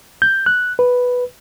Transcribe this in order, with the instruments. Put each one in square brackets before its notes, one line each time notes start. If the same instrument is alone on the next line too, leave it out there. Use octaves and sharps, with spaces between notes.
[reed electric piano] G6
F#6
B4